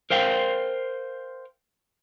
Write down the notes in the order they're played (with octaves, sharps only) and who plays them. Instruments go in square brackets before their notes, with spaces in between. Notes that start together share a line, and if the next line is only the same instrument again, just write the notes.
[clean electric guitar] A#4 C5 F5 G5